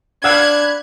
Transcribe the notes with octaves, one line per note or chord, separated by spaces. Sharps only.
D4 F5 F#5 B5 E6 F#6 G#6